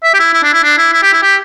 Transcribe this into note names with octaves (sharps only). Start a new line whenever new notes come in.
E5
G4
E4
E4
D4
E4
D4
E4
E4
G4
E4
G4